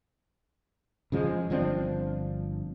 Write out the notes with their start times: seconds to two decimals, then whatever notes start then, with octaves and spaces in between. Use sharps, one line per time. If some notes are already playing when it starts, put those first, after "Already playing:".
1.12 C#3 F3 G#3
1.50 G1 F3 C4 D4